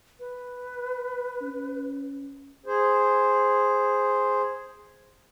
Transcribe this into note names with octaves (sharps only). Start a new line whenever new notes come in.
B4
C#4
G#4 C5